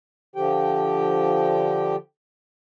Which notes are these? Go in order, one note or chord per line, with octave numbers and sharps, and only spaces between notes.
D3 F3 G4 G5